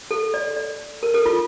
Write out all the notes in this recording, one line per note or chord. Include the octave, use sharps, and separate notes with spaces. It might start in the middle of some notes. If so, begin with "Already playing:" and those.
A4
D5
D5
A#4
A4
F4